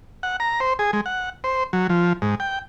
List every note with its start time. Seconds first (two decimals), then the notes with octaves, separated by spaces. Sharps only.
0.23 F#5
0.40 A#5
0.60 C5
0.79 G#4
0.93 G#3
1.06 F#5
1.44 C5
1.73 F#3
1.89 F3
2.22 G#2
2.40 G5